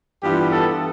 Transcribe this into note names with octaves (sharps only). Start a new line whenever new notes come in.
G2 E3 B3 F4 G4
A4